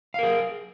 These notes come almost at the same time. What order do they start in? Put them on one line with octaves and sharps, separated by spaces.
F5 A#4 G#4